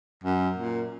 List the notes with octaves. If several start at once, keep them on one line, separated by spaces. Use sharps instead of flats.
F#2
A#2